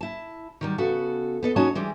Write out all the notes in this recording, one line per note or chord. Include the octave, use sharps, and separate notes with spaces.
E4 A5
D#3 F#3 G3
C#3 B3 F#4 A4
B3 A4 D#5
C#4 D#4 F#4 C#5 D#5 A5
E3 G3 G#3